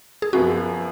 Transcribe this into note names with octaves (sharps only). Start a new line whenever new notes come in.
G#4
F#2 F3 B3 F#4